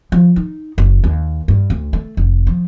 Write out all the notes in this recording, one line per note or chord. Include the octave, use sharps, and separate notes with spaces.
F3
D#4
F#1
D#2
G2
D2
A3
F1
F3